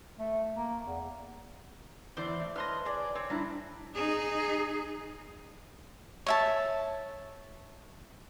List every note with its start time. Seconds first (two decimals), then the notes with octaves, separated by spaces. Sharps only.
0.19 A3
0.56 A#3
0.87 E2
2.17 E2 E3 C5 D5
2.40 A3
2.56 B4 C#5 D#5 A5 C6 F6
2.85 G#4 D5
3.15 C4 C#5
3.30 G3 D4 E4 A#5
3.95 D#4 G#4
6.26 C#5 E5 A5